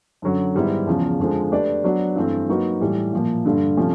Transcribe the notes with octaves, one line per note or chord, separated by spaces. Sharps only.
F#2 D3 F#3
G#2 D#3 G3 B3 E4
E2 C#3 F3
F2 D3 F3 G#3
A3 D4 G4 B4 D5
F#3 B3 D4 F#4
G2 E3 A3 C4
F#3 A#3 D#4 F#4 B4
A2 E3 G3
A#2 F3 A#3
G2 D3 G3
C3 F3 A3 C#4